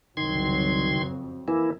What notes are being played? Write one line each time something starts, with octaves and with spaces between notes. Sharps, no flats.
F#1 C2 D#3 F#3 C6 G#6
F2
E3 A#3 E4